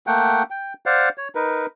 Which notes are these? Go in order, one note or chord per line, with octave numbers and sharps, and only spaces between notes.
A3 A#3 F#5 G5
G5
C5 D5 F5 F#5
C#5
D#4 A#4 B4